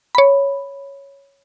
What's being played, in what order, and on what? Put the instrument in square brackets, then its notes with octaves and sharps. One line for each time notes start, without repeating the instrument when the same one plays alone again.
[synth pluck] C#5 B5